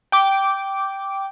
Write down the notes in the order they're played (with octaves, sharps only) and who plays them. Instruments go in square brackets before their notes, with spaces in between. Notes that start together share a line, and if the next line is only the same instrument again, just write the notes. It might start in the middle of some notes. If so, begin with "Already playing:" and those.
[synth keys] G5 D6